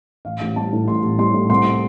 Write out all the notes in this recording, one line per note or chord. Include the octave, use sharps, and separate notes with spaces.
A1 F5
A1
G3 A5
A2
A1 C6
A1
G3 C6
A2
C2 C6